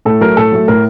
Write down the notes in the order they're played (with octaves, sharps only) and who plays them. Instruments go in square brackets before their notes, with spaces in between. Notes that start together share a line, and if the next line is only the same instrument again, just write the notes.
[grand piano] A2 A4
F#3 A3 A#4
A2 A4
F#3 A3
A2 A#4